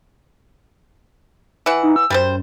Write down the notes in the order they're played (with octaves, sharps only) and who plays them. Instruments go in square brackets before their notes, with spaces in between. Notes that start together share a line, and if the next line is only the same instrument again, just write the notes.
[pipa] E3 F#5
[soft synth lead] D#4
E6
[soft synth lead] F#2 [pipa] G3 B4 C5